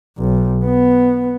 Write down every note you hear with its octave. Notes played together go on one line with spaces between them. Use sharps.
B1
B3